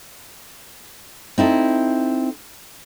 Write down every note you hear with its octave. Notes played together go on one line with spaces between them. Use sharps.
C4 D#4 E4 A4